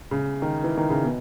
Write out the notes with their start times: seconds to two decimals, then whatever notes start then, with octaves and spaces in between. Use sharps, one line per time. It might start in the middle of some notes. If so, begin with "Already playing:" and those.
0.11 C#3
0.42 D#3
0.64 E3
0.78 D#3
0.90 C#3
1.03 B2